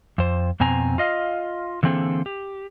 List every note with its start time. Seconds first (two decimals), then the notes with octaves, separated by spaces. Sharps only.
0.18 F2 C5
0.60 F2 B2 C4 G#5 A#5
0.98 F4 D#5 F5
1.83 D3 E3 A#3 C4 G#4 A4
2.26 G4